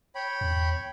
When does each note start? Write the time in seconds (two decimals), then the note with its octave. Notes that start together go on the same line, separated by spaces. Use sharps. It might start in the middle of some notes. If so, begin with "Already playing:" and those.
0.15 C#5 G5 B5
0.41 E2